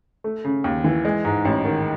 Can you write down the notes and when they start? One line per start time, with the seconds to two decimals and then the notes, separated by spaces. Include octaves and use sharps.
0.24 A3
0.45 C#3
0.64 D#2
0.84 E3
1.05 G#3
1.25 G#2
1.45 A1
1.65 D#3